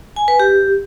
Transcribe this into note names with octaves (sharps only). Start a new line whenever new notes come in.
G#5
B4
G4